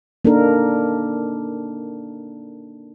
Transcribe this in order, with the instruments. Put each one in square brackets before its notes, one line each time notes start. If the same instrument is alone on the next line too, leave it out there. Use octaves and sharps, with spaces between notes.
[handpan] A#3 D4 D#4 A4 A#4